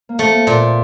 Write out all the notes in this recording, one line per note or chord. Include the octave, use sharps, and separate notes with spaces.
A#3
A3 C4
A#3
A#2 A#3
C4